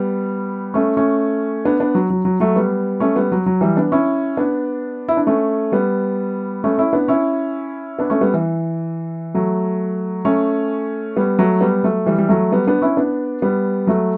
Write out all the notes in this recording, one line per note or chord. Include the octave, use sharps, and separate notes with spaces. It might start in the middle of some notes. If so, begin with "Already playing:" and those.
Already playing: G3 B3
A3 C#4
A3 C#4
B3 D4
B3 D4
F#3
F#3
F#3
F#3 A3
G3 B3
A3 C#4
G3 B3
F#3
F#3
E3 G3
B3 D4
C#4 E4
B3 D4
E4
D4
A3 C#4
G3 B3
A3 C#4
C#4 E4
B3 D4
C#4 E4
B3 D4
A3 C#4
G3 B3
E3
F#3 A3
A3 C#4
G3 B3
F#3 A3
G3 B3
F#3 A3
E3 G3
G3
F#3 A3
G3 B3
B3 D4
C#4 E4
B3 D4
G3 B3
F#3 A3